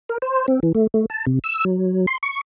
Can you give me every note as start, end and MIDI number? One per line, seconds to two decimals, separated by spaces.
0.09 0.18 70
0.22 0.46 72
0.48 0.60 60
0.63 0.72 52
0.75 0.87 57
0.94 1.06 57
1.10 1.25 81
1.27 1.39 48
1.44 1.64 88
1.65 2.06 54
2.07 2.18 84
2.23 2.41 85